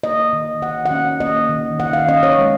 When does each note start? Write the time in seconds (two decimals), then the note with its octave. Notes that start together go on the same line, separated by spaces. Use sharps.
0.03 A#3 D#5
0.33 D#3
0.62 D#3 F#5
0.86 F#5
0.91 C#4
1.20 A#3 D#5
1.49 D#3
1.80 D#3 F#5
1.93 F5
2.08 C#4 D#5
2.23 C#5
2.38 G#3